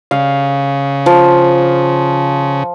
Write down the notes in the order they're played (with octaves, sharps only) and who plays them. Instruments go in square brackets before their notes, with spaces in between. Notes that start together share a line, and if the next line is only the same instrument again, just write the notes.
[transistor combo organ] C#3 [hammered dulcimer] F5
[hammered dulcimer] F3